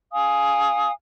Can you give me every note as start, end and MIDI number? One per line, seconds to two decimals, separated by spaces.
0.12 0.91 77
0.12 0.91 80
0.12 0.91 87